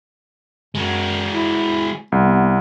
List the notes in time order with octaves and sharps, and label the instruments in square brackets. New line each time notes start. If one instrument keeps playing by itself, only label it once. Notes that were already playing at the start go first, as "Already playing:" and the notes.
[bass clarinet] F#2 [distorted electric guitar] G#3 F#4
[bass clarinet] E4
[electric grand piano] C2 [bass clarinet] B3